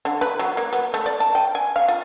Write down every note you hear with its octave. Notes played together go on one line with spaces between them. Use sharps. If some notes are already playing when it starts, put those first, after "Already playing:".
D3
B4
F#3
A#3
B3
A3
D5
A5
G5
G#5
F5
F4